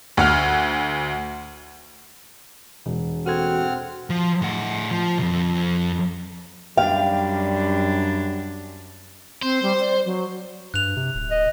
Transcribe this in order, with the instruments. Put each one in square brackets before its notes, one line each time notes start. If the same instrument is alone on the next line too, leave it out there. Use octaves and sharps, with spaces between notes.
[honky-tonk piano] D2 F#5 F6
[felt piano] E1
[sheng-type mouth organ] C4 F#5 F6 [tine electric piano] F#4 A4 G#6
[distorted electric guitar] F3
A2 F#5
F3
C2 F2
[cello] F#2 D4 [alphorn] G3 [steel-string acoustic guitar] F5 [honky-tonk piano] G5
[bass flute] C4 [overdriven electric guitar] C5
[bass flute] G3
D5
F#3
[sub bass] G2 [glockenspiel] F#6 F7
[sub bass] C3
D1
[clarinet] D#5